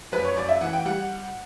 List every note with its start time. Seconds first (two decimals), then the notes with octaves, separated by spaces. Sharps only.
0.12 F#2 B4
0.25 C#5
0.36 F#2 D5
0.49 E5
0.61 E3 F#5
0.73 G5
0.85 G3 F#5